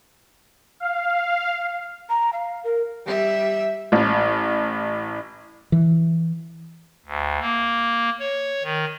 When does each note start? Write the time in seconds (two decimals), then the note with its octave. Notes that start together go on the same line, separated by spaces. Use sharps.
0.80 F5
2.09 A#5
2.33 F5
2.64 A#4
3.06 G3 E5
3.92 A1
5.72 E3
7.06 D2
7.40 A#3
8.19 C#5
8.63 D#3